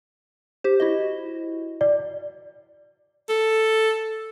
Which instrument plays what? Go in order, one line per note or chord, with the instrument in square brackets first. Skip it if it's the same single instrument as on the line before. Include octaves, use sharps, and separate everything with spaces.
[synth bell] G4 C5
E4 F#4 D#5
[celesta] D5
[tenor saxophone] A4